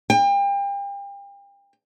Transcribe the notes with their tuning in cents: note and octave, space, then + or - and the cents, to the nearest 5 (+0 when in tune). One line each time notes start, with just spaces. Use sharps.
G5 +35